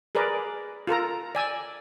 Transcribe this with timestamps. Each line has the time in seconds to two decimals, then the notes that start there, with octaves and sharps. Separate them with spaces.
0.15 G#4 A#4 B4 D5
0.87 F4 A4 A#4 A#5
1.35 D5 G#5 E6